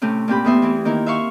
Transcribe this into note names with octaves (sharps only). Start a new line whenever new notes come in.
A2 C3 A3 C4 C#4
A#2 C4 G4 B5
E2 A3 B3 E5 C6
E3 C4 E4
D#3 A#3 E4 A#4
E5 F5 C6 C#6